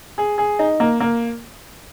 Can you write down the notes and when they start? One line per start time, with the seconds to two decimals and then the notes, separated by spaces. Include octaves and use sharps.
0.18 G#4
0.38 G#4
0.59 D#4
0.80 A#3
1.00 A#3